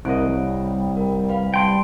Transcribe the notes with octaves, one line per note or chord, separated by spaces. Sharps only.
C2 C4 A#4 D#5 F#6 D7
G3 C#5
A#4
B4 F5 B5
G3 G5 A5 C6